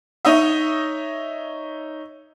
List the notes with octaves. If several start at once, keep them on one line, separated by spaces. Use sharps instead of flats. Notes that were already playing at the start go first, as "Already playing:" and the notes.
D#4 C#5 D#5 E5